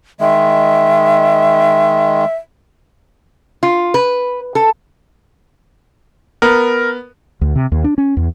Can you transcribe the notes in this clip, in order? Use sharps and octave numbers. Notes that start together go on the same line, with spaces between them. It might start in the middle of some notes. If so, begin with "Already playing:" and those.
D#3 G#3 E5
F4
B4
A4
B3 A#4
D2
C3
D#2
D4
C#4
E2